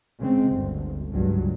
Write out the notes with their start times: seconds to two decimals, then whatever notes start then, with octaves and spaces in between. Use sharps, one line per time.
0.20 C#3 G#3 C4
0.51 G1 D2
1.11 C#2 G2 F#3